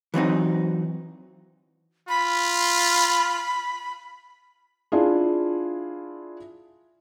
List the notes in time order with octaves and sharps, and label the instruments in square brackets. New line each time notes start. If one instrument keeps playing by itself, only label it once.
[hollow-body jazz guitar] E3 F#3 C4 D#4
[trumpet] F4 [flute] B5
[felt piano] D4 E4 F4 G#4